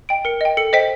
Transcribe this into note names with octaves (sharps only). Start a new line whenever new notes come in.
D#5 G5 D7
A#4 C#7
D#5 G5
A4 C#7
C5 D#5 G5 B6